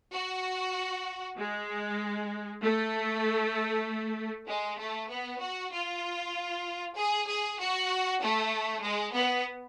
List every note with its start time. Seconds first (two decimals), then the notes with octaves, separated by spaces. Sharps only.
0.13 F#4
1.37 G#3
2.62 A3
4.48 G#3
4.79 A3
5.10 B3
5.40 F#4
5.72 F4
6.95 G#4
7.27 G#4
7.59 F#4
8.21 A3
8.82 G#3
9.13 B3